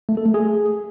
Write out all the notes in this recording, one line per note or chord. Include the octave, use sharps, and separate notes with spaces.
A3
A4
A3
G#4